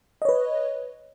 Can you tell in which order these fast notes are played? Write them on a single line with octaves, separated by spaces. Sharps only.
D#5 C#5 B4